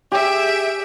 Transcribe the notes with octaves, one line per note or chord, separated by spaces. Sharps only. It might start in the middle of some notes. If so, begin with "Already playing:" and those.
G4 G#4 E5 D7